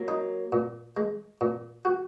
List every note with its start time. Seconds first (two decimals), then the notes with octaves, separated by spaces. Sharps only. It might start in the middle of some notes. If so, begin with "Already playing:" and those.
Already playing: F#3 A#3
0.08 D#4
0.52 A#2
0.97 G#3
1.41 A#2
1.85 F#4